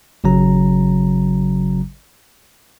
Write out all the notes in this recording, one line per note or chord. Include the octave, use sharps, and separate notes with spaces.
G#1 C#3 F#3 A#5